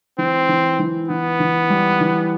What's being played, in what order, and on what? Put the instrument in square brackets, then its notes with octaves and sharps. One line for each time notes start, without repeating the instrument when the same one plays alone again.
[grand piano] E3 [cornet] C4
[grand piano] E3
E3
[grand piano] E3 [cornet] B3
[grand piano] E3
G3
E3